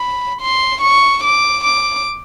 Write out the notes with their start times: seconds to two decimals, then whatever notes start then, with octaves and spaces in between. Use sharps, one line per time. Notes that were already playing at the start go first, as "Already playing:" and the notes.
Already playing: B5
0.41 C6
0.82 C#6
1.23 D6
1.64 D6